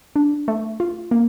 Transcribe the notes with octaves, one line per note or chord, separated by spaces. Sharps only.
D4
A3
F4
A#3